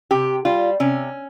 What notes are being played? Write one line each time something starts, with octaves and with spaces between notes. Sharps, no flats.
C3 G4
G3 F4
C3 C#4